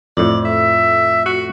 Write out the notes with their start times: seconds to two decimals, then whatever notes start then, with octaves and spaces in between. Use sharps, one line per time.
0.17 F2 A2 D5
0.45 E5
1.26 F#4